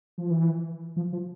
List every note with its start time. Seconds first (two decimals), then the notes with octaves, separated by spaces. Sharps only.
0.18 F3
0.31 E3
0.96 F3
1.13 F3